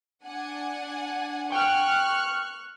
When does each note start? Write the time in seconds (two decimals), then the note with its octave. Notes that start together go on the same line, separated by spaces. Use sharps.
0.24 D4 F#5 G#5
1.52 G5 C#6 F6 F#6